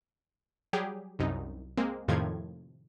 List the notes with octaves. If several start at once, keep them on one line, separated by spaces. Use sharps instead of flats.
F#3 G3 G4 G#4
C2 F#2 D#4
G#3 A#3 C4
F2 A2 C3 D#3 F3 G#6